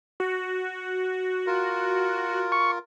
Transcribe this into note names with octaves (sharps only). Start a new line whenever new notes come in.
F#4
F4 A#4
C#6